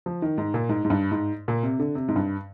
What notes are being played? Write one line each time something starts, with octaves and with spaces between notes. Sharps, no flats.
F3
D#3
G#2
A#2
G#2
G#2
G2
G#2
A#2
C3
D3
C3
G#2
G2